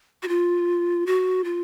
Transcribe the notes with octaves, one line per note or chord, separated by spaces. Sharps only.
F#4
F4
F#4
F4